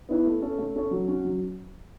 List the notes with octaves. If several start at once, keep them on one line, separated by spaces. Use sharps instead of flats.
B3 E4 B4
A3
C#4 A4 C#5
A3
C#4 A4 C#5
F#3
C#4 F#4
F#3